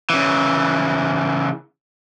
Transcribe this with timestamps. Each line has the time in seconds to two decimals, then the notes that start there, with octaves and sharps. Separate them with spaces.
0.10 C#3 E3